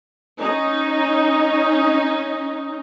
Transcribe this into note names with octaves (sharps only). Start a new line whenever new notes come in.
C#4 D#4